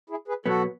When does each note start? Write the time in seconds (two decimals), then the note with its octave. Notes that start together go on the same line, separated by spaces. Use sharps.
0.10 E4 G#4
0.28 G#4 B4
0.46 B2 F#3 B3 F#4 A4